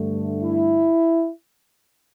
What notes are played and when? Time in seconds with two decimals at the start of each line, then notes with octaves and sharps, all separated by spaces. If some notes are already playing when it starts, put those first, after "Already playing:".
Already playing: G2 D3 A3
0.42 E4